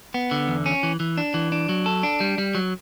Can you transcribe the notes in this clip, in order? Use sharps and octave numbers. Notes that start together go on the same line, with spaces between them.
B3
D3
E2
C#4
E3
E3
D4
E3
D4
F#3
A4
D4
G3
G3
F#3